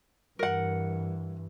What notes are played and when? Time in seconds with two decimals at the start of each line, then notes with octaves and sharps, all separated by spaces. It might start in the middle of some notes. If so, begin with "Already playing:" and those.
0.39 G2 E3 A#4 F#5